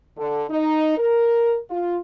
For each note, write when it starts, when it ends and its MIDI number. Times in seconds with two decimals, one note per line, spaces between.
0.17 0.43 50
0.50 0.97 63
0.98 1.58 70
1.70 1.98 65